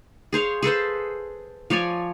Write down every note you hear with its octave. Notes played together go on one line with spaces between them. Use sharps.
G#4 C5 C#5 F5
G#4 A4 B4 C5
F3 C#5 D5 G#5